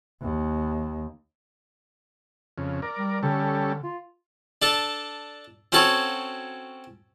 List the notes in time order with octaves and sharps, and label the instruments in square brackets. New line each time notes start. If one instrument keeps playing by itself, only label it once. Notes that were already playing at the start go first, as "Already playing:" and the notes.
[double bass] D#2
[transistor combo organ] F2 C#3
A#4 D5
[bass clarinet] G3
[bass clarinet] D3 [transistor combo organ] G3 C#4 A4
[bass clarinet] F4
[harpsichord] D4 A4
C4 C#4 F#4 A4 C#5